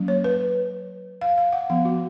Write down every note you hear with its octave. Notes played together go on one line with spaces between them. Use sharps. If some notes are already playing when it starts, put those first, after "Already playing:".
Already playing: F#3 A#3 C#4
C#5
B4
F5
F5
F#5
F3 B3 F5
F#4